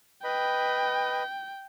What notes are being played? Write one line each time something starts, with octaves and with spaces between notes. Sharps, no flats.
B4 D#5 G5 B5